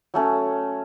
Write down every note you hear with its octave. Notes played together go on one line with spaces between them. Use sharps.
F#3 A3 C#4